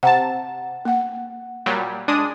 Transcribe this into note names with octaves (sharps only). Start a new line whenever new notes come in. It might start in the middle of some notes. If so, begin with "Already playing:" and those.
C3 F#5 A5 A#5
A#3 F#5
A#2 F#3 G3
G#3 D4 D#6